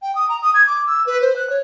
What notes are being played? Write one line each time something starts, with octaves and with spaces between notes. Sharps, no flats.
G5
D#6
A#5
D#6
G#6
D6
E6
B4
C5
F#6
C#5